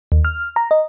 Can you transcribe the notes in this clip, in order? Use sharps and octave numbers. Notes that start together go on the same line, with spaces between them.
D#2
F6
A#5
D#5